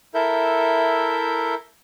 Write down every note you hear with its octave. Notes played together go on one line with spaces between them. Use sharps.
E4 A4 A#4 E5 G6